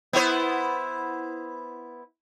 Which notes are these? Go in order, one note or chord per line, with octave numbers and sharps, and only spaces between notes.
B3 E4 C5